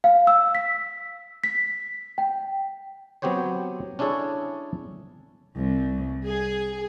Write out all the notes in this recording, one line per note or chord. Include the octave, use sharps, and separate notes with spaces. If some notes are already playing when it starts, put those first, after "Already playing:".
F5
E6
B6
B6
G5
F#3 B3 C4 G4 C5 C#5
C#4 D4 E4 G#4 A4 C#5
C2
G#4